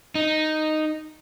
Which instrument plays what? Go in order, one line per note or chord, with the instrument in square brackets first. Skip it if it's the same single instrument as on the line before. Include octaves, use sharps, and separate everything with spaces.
[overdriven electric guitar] D#4